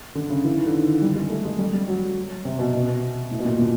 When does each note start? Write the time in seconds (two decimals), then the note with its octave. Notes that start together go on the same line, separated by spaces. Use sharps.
0.15 D3
0.30 C#3
0.45 E3
0.55 D#3
0.66 D3
0.77 D#3
1.02 G3
1.16 G#3
1.30 A3
1.45 G#3
1.58 G3
1.73 G3
1.88 F#3
2.45 C3
2.59 B2
2.74 B2
3.31 A2
3.39 B2
3.45 A#2
3.59 A#2